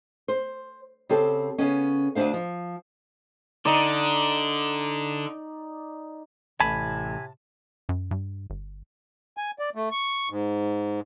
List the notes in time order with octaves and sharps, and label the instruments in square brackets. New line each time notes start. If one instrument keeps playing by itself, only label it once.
[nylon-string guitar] C5
C#3 C4 G4 A4
C#3 B3 C#4
D2 C3 D4 C5 F5
F3
[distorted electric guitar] D3 [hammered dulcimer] D#4 D5
[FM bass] A1 [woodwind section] A2 C3 [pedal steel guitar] G#5 B5 [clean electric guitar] A5
[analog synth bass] F#2
G2
G1
[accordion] G#5
D5
A3
C#6
G#2